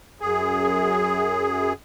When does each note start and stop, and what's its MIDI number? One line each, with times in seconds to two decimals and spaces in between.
0.21 1.73 42
0.21 1.73 68